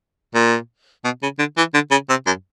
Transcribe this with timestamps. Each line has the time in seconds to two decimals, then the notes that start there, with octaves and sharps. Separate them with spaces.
0.35 A#2
1.04 B2
1.22 C#3
1.39 D3
1.57 E3
1.74 D3
1.91 C#3
2.09 C3
2.26 F#2